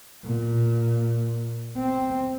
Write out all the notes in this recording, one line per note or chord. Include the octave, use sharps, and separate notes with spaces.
A#2
C4